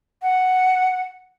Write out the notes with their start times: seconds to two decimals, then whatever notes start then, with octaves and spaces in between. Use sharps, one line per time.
0.22 F#5